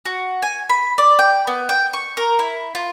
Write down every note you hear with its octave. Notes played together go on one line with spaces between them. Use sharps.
F#4
G#5
B5
D5
G5
B3
G5
C#6
A#4
E4
F4